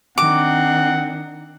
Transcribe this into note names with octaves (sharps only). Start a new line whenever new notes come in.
D#3 C4 D4 F#5 D6